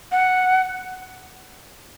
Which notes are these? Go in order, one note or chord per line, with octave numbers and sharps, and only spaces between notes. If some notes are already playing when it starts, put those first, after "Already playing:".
F#5